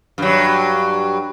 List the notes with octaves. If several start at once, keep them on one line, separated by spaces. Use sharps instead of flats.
G2 F#3